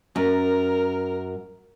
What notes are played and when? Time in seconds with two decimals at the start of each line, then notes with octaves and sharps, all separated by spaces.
0.16 F#2 A#4